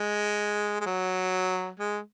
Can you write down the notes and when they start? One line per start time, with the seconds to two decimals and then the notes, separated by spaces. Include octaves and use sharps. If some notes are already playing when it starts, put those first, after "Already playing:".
Already playing: G#3
0.81 G#3
0.86 F#3
1.79 G#3